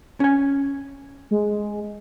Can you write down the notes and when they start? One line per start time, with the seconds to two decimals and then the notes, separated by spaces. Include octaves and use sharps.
0.20 C#4 G#5
1.31 G#3